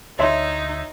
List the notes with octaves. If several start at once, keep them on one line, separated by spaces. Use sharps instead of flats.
D2 D#4 C#5 E5 C6